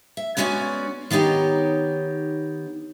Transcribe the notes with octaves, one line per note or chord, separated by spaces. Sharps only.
E5
G#3 B3 C#4 F#4 D5 G#5
D#3 B3 D#4 G4 C#5